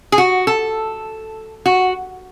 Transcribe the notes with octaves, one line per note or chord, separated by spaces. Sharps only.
G#4
F#4
A4
F#4